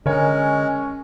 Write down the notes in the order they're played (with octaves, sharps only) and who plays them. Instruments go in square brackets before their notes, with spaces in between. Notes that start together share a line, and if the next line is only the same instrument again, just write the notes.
[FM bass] D3 [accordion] G#3 [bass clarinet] C#4 [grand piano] A#4 C#5